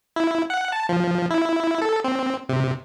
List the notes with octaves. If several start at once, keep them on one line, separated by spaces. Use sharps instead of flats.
E4
F#5
A5
F3
E4
A4
C4
C3